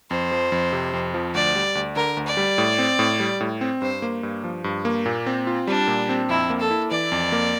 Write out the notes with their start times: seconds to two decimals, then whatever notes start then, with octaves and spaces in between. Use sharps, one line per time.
0.11 F2 C5
0.31 F3
0.52 F2
0.73 C3
0.93 F2
1.14 F3
1.34 D2 D5
1.55 G3
1.75 D2
1.96 D3 A#4
2.17 D2
2.27 D5
2.37 G3
2.58 A2
2.79 C4
2.99 A2
3.20 G3
3.41 A2
3.61 C4
3.82 G2 C5
4.02 A#3
4.23 G2
4.44 F3
4.64 G2
4.85 A#3
5.06 A#2
5.26 C4
5.47 F4
5.67 G3 D4
5.87 A#2
6.09 C4
6.29 F2 E4
6.50 A#3
6.60 A4
6.71 E4
6.91 E3 D5
7.12 F2
7.32 A#3